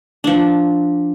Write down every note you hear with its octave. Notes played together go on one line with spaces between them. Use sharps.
F3 D4